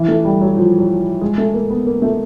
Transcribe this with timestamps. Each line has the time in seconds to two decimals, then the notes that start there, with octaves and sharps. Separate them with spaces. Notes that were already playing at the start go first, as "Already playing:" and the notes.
Already playing: E3
0.08 A3
0.25 G3
0.41 F#3
0.57 F3
0.78 F#3
1.21 G#3
1.38 A3
1.54 A#3
1.70 B3
1.87 A#3
2.02 A3